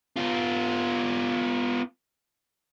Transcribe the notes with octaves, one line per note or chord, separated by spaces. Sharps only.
B3 F4